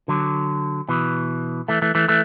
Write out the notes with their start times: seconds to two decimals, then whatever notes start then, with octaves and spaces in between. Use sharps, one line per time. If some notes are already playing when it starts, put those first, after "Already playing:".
0.08 D3 F#3
0.89 B2 E3
1.68 E3 A3
1.82 E3 A3
1.95 E3 A3
2.09 E3 A3